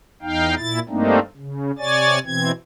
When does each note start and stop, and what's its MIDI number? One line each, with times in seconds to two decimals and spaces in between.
0.22 0.55 40
0.22 0.55 63
0.22 0.55 77
0.22 0.55 79
0.57 0.79 46
0.57 0.79 64
0.57 0.79 93
0.89 1.19 43
0.89 1.19 57
0.89 1.19 58
0.89 1.19 60
0.89 1.19 62
0.89 1.19 63
1.37 1.71 49
1.78 2.19 48
1.78 2.19 73
1.78 2.19 74
1.78 2.19 80
1.78 2.19 93
2.25 2.51 47
2.25 2.51 52
2.25 2.51 60
2.25 2.51 92